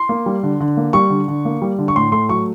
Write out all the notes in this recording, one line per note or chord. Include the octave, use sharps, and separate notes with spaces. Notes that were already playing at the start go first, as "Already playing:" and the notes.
Already playing: C6
A#3
G3
D3
D3
A#3
G3 C#6
D3
D3
A#3
G3
D3
C#6
A2 C6
A3 C6
F#3 C#6